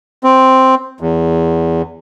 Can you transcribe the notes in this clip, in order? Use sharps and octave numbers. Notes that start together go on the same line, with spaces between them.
C4
E2